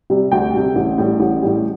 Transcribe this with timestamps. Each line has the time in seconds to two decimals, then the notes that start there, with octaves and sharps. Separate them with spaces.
0.10 C3 G3
0.32 D2 G5
0.54 C3 G3
0.75 A1
0.98 A2 G3
1.20 A1
1.42 A2 G3